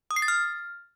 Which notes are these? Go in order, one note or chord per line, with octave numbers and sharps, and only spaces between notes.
D#6
C7
A6
F6